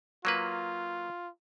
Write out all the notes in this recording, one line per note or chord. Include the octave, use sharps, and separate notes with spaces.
F#3 A#3 F4 B4